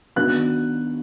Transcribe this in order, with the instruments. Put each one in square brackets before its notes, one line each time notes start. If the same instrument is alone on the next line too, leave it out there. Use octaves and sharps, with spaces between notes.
[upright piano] D#3 F#3 B3 D4 F#6